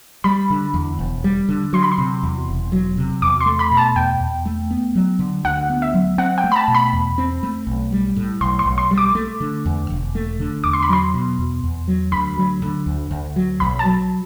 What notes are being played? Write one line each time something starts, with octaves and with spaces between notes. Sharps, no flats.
G3 B5
D3
E2
E1
G3
D3
F#3 C6
B5
C6
C3
E2
E1
F#3
C3
E2 D6
C6
A3
B5
B2
A5
E2 G5
E2
A3
B3
F#3
D3
D2 F#5
B3
E5
F#3
C4 F#5
G5
A3
B5
A5
B2
B5
E2
C4
A3
B1
G3
A2
B1 C6
C6
B1
C6
G3
D6
A3
D3
E2
E1
A3
D3
E2 D6
C6
B5
F#3 C6
B2
E2
E2
F#3
D2 B5
F#3
D3
D2
D2
F#3
B1 B5
A5
F#3